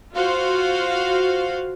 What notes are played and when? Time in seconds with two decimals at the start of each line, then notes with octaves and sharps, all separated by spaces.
0.13 F4 F#4 C5 F5